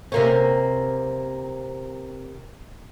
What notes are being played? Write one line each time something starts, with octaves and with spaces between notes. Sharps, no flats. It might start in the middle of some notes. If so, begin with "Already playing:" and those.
C3 A#3 C#4